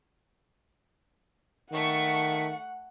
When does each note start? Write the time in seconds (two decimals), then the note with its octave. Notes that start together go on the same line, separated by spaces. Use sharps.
1.72 D#3 A3 F#5 C#6 B6